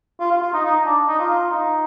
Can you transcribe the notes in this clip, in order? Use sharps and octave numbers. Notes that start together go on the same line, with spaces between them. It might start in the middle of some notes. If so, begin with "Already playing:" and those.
F4
F4
F4
D#4
D#4
D4
D#4
F4
D#4